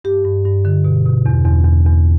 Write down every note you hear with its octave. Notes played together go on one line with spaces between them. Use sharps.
G2 G4
G2
G2
D3
B2
B2
E2
E2
E2
E2